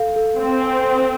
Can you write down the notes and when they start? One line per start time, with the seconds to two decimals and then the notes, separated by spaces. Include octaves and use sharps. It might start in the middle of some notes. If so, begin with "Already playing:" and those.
Already playing: A4 F5
0.16 A4
0.38 C4 F5
0.60 G#5
0.83 A4